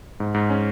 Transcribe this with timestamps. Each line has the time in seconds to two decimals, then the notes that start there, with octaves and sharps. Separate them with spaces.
0.20 G#2
0.34 G#2
0.50 C#4